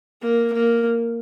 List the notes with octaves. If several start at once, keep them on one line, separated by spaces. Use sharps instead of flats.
A#3
A#3